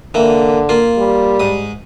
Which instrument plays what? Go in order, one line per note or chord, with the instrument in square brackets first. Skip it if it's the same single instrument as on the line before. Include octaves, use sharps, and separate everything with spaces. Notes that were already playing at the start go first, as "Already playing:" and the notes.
[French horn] D3 [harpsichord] E3 A#3
[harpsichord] A#3 F4
[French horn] G3
[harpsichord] G#2 D#6